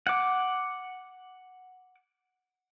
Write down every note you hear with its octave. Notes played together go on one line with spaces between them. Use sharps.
F#5 D6